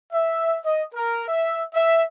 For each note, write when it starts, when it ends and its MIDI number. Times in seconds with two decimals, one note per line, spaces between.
0.13 0.58 76
0.64 0.83 75
0.94 1.24 70
1.28 1.64 76
1.74 2.04 76